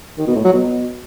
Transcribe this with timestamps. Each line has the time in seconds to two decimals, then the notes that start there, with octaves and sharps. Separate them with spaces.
0.18 D#3
0.27 B2
0.36 A2
0.44 F#3
0.53 B2